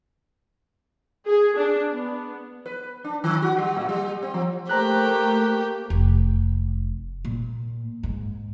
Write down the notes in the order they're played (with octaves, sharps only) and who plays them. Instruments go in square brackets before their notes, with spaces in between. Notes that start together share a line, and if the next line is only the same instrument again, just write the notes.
[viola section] G#4
D4
B3
[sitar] B4
D4
D#3
F#4
G3
A2
G3
C4
F3
[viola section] A3 A#3 [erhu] G4 [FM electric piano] C5 A#5 F#6
[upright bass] F1
A#2
G#2